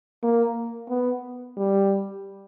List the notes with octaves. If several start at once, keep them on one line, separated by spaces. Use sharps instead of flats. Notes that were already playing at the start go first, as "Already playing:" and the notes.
A#3
B3
G3